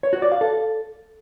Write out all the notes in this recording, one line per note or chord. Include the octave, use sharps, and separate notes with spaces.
C#5
F#4
D5
F5
A4